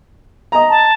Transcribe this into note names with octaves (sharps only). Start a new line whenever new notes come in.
D#5 A#5
A5